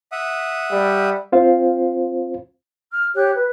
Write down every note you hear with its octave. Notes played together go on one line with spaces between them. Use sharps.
E5 F#5 D#6
G3
C4 F4 C5 F5
F6
G4 C#5 F#6
B4